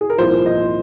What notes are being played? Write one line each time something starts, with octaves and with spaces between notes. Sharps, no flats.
G#4
A#4
C2 A#2 F3 C5
D#5